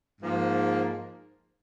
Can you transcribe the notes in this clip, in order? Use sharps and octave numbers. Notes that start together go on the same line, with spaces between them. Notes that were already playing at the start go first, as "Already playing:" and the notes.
G#2 F3 A#3